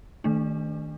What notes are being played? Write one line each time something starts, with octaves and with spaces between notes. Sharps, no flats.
D#3 A3 D4